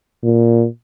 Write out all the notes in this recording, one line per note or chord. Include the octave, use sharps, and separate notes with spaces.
A#2